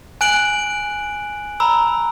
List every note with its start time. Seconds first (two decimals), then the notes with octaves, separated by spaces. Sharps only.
0.21 G#5 F#6 D7 F#7
1.60 A#5 B5 E6